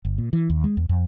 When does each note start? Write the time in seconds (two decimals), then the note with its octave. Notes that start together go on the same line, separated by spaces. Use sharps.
0.05 G1
0.18 A#2
0.33 E3
0.50 D#2
0.64 G#3
0.77 E2
0.89 F2